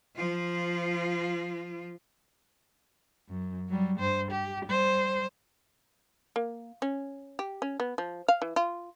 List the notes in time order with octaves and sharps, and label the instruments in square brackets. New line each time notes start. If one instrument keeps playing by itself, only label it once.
[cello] F3 F4
F#2
F#3 G3
G2 C5
G4
G3 C5
[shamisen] A#3
C#4
G4
C#4
B3
F3
F5
E3
F4